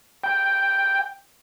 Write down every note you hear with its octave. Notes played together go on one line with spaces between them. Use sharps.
G5